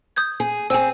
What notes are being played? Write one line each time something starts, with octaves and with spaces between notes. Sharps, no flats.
D#6 G6 G#6
G#4
C4 G#4 G5 G#5 E6